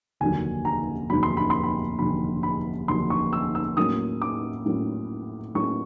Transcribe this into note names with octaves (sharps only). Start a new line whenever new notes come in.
F1 D#2 D3 F#3 G#5
A#5
F1 D#2 D3 F#3 B5
C6
B5
C6
B5
F1 D#2 D3 F#3 B5
B5
F1 D#2 D3 F#3 C6
C#6
E6
E6
A2 F#3 A#3 C#4 D#6
D6
A2 F#3 A#3 C#4
A2 F#3 A#3 C#4 C#6